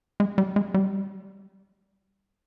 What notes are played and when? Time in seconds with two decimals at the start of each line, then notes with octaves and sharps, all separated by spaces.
0.20 G#3
0.38 G3
0.56 G#3
0.74 G3